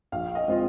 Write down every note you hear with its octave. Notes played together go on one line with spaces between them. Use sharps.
A#1 F5
D#5
G#3 C4 F4